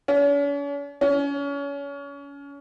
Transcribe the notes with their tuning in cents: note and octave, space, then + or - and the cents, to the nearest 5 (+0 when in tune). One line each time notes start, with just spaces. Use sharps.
C#4 +45
C#4 +30